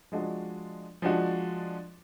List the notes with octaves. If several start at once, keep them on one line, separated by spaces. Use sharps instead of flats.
F3 G#3 D4 F#4
F3 G#3 D4 F#4